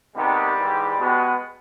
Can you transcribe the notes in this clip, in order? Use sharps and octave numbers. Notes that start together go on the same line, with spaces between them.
C3 D#3 G3 G#3 B3 G4
G#2 E3 G#3
B2 G#3 B3